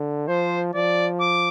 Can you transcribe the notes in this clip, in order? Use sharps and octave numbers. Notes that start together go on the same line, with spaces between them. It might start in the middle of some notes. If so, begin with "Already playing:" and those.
Already playing: D3
F3 C5
F3 D5
D6